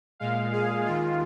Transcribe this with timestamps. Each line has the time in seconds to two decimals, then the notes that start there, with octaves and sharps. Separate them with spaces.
0.20 A#2 G#3 F5
0.52 G#4
0.86 D#2 D#3 G#3 F4